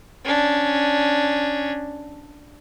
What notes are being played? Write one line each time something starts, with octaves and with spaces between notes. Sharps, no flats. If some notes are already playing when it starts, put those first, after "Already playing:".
C#4 D4